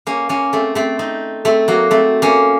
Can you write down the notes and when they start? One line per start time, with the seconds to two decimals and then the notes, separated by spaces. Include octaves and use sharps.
0.07 A#3 C#4
0.29 A#3 C#4
0.53 A3 C4
0.75 A3 C4
0.99 C4 D#4
1.45 A3 C4
1.68 F#3 A#3
1.91 A3 C4
2.22 A#3 C#4